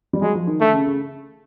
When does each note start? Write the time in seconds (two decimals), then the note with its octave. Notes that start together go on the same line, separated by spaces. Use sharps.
0.13 G3
0.22 F#3 G#3
0.35 F3
0.47 D#3
0.60 D3 A3
0.73 C#3
0.86 C#3